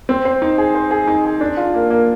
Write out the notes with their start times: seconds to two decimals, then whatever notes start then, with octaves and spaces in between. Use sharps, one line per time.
0.09 C4
0.25 C5
0.42 D#4
0.58 G#4
0.75 C5
0.91 G#4
1.08 D#4
1.25 G#4
1.41 D4
1.57 F4
1.74 A#3
1.90 A#3